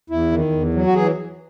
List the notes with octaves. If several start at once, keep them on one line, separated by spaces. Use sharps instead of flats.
E2 E4
D#3
E2
F#3
F#4
E3 G#4